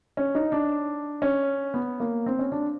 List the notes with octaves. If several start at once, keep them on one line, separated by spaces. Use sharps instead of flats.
C#4
D#4
D4
C#4
B3
A#3
C4
C#4
D4